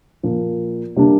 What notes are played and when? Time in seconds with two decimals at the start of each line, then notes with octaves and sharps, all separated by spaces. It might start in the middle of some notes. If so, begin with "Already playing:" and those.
0.23 A#2 F3 A#3
0.96 C3 G3 A#3 D4